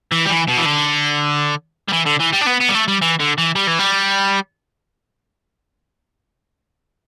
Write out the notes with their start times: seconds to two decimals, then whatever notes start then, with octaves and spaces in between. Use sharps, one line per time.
0.12 E3
0.26 G3
0.30 E3
0.48 B2
0.58 E3
0.66 D3
1.89 G3
1.93 E3
2.06 D3
2.20 E3
2.33 G3
2.42 D4
2.47 B3
2.61 B3
2.69 G3
2.74 A3
2.88 G3
3.02 E3
3.20 D3
3.38 E3
3.56 G3
3.67 E3
3.79 G3